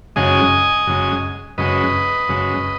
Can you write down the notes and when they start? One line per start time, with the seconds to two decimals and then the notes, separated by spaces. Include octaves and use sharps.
0.16 F#2 C#3 G#3 D#5 G#5
0.87 F#2 C#3 G#3
1.58 F#2 C#3 G#3 B4 D#5
2.29 F#2 C#3 G#3